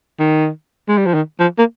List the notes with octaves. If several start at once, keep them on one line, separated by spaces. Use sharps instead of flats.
D#3
G#3
G3
F3
D#3
F3
A#3